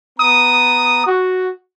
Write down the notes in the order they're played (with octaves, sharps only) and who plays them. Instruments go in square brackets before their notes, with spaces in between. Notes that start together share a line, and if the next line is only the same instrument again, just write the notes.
[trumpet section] B3 A#5 D#6
F#4